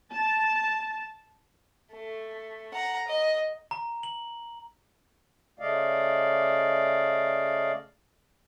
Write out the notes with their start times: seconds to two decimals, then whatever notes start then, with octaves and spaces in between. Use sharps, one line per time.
0.11 A5
1.92 A3
2.74 F#5 A#5
3.08 D#5
3.71 A#5
4.03 F#7
5.59 C#3 A3 D5 D#5 F5